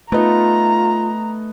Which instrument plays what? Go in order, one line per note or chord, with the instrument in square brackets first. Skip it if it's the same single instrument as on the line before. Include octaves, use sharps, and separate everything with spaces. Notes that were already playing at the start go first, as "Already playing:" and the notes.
[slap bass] A3 [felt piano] B3 D#4 [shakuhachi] F4 [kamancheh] A#5